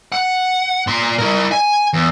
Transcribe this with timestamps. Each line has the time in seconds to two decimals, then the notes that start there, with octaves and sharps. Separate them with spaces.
0.12 F#5
0.87 A#2 C6
1.18 E4 A#4
1.52 G#5
1.93 E2